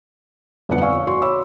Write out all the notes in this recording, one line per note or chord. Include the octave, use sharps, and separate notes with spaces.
G1 F2 D3 B3 F#5 C#7
D5 F5 G#5 C#6 E6
C#5
F#4 D5 C6 C#6
C#5 B5 D6 E6